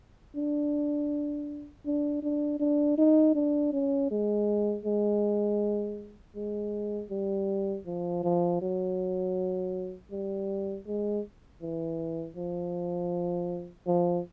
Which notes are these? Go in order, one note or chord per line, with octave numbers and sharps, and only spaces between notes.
D4
D4
D4
D4
D#4
D4
C#4
G#3
G#3
G#3
G3
F3
F3
F#3
G3
G#3
E3
F3
F3